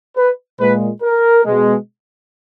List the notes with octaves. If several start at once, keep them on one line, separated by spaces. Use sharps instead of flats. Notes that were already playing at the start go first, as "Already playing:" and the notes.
B4
A#2 G#3 B4
A#4
B2 G#3